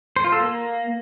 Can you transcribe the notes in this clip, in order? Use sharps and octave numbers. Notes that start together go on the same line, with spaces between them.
C5
F4
A4
A#3